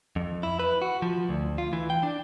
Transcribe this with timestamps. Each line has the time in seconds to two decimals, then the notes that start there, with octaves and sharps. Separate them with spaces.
0.16 F2
0.43 E4
0.59 B4
0.82 F#4
1.02 F3
1.29 D2
1.58 F4
1.73 E3
1.90 G5
2.03 D4